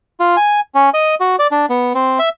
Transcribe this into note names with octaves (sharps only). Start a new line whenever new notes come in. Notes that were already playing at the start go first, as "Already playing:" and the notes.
F4
G#5
C#4
D#5
F#4
D5
D4
B3
C4
E5